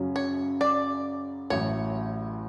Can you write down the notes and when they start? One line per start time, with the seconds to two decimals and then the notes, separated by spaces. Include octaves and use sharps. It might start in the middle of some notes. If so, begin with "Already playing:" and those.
Already playing: F#2 C#3 F#3 C#4
0.16 C#5
0.61 D5
1.50 A1 A2 F#3 C#5